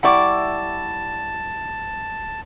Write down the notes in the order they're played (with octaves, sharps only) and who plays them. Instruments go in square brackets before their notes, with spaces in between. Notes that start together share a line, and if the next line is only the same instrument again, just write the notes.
[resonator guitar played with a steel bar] G3 E4 D5 [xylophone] F#5 C#6 D6 [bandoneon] A5